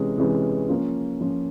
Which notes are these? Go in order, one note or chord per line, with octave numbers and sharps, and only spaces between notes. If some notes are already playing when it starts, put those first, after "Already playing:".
Already playing: C3 E3 G#3 C#4
C3 E3 G#3 C#4
F3 A#3 C#4 F4
F3 A#3 C#4 F4